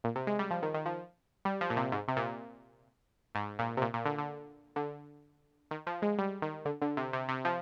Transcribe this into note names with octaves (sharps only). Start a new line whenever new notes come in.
A#2
C3
G#3
G3
F3
D#3
D#3
F3
G3
F3
A#2
C3
G#2
C3
A#2
G#2
A#2
C3
A#2
A#2
D3
D3
D3
D#3
F3
G#3
G3
D#3
D3
D3
C3
C3
C3
F3